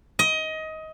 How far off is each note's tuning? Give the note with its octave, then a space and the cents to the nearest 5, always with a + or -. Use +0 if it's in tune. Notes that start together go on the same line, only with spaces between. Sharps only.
D#5 +20